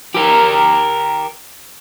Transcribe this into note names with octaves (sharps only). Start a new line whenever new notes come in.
G4 A#4